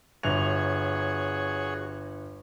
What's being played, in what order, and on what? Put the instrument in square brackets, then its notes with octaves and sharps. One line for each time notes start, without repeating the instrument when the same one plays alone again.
[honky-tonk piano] G1 F7 [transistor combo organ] F#4 G#4 C#5